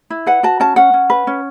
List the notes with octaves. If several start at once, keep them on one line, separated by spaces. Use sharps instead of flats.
E4
B4 F#5
F#4 A5
C#4 A5
C#4 F#5
C#4
B4
C#4